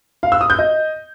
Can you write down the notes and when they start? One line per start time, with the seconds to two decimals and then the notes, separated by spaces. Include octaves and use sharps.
0.23 F5
0.32 E6
0.41 D#6
0.50 G6
0.59 D#5